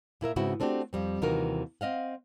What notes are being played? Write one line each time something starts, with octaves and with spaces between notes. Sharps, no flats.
A#2 E4 A#4 E5
G#2 C#3 B3 C4 E4 F#4
A3 C4 D4 F#4 G4
F2 G3 C4
D#2 C3 E3 D#4 F#4 A#4
C4 D#5 F5 F#5